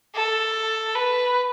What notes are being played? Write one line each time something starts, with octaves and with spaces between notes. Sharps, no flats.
A4
B4